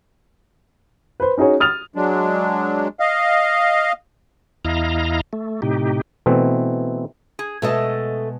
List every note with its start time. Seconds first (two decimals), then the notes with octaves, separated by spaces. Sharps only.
1.20 B4 C5
1.38 C#4 D#4 F#4 G#4 C#5
1.60 D#6 F6 A6 F7
1.95 F#3 G#3 D4
3.00 D#5 F5
4.65 E2 E4 D#5 F5 A#5
5.33 A3
5.62 A2 C3 D#4 G4
6.26 B2 E3 A3 C4
7.39 G#4
7.62 B2 G#3 A3 A4 D#5 A5